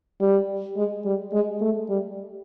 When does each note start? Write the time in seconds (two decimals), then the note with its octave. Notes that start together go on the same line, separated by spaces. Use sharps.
0.21 G3
0.77 G#3
1.05 G3
1.33 G#3
1.61 A3
1.89 G3